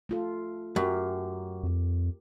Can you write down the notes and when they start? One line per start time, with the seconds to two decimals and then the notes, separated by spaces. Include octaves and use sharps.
0.09 A3 F4 A4
0.76 F#2 G4 A#4
1.63 F2